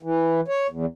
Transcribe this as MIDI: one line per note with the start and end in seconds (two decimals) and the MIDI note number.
0.03 0.41 52
0.48 0.67 73
0.70 0.86 40